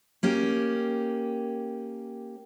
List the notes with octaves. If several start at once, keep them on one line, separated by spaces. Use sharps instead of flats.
A#3 C#4 G4